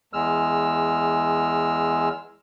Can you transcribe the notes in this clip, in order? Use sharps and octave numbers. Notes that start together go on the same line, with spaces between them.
E2 G#3 E6 F6